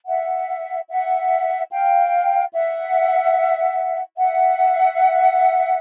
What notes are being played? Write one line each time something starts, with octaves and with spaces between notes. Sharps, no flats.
E5 F#5
E5 F#5
F5 G5
E5 F#5
E5 F#5